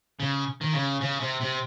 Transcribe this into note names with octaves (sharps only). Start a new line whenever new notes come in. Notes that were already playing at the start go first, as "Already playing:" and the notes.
C#3
D#3
C#3
C#3
C3
C3